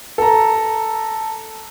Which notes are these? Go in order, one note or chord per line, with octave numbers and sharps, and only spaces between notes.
A4 A#5